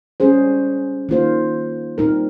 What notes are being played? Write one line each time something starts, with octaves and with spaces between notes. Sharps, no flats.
G3 C#4 G#4 C5
D#3 A#3 F4 C5
A#2 G3 C4 D#4 A#4